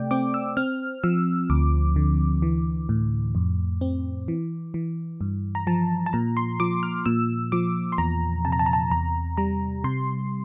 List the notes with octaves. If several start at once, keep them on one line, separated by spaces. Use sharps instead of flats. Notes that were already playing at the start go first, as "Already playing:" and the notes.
Already playing: C3 A3 D5 G5
C4 D6
E6
C4 F6
F3 E6
D2 D6
D3
E3
A2
F2
C4
E3
E3
G2
A#5
F3 A5
A5
A#2 A#5
C6
F3 D6
F6
A#2 E6
F3 D6
C6
E2 A#5
C3 A5
A#5
A5
A#5
A5
E2 A#5
G3 A#5
C3 C6